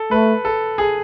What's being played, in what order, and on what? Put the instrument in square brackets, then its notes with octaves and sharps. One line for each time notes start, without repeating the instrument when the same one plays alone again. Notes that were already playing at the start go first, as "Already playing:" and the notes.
Already playing: [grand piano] A4
[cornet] A3 [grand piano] B4
[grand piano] A4
G#4